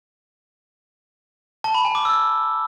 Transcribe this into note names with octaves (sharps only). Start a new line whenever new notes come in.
A5
B5
G#5
D6
E6